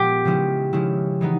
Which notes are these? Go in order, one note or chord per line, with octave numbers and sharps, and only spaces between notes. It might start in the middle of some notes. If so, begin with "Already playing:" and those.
Already playing: A#2 F3 G#3 B3 G4
C#3 F3 G#3 C#4 E4
C#3 F3 G#3 C#4 E4
E3 G#3 B3 D#4